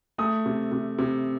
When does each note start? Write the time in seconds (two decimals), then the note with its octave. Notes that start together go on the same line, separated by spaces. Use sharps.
0.18 A3 D#6
0.46 C3
0.72 C3
0.99 C3